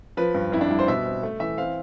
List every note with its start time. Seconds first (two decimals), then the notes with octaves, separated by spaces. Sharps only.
0.17 F3 B4
0.35 G2
0.52 F2 E4
0.61 D4
0.70 G3 E4
0.79 C5
0.87 B2 E5
1.05 C4
1.23 A3
1.40 E3 E5
1.58 C4 F5